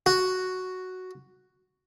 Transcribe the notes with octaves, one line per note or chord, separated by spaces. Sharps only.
F#4